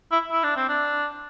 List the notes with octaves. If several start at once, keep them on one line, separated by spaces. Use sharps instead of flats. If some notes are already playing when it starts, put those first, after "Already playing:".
E4
E4
D4
C4
D4